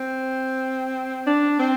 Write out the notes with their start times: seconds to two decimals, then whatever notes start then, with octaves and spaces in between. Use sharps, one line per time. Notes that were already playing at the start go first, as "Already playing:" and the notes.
Already playing: C4
1.27 D4
1.59 C4